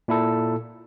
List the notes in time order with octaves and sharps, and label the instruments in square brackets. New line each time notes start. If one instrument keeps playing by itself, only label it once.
[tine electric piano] A#2 E4 A4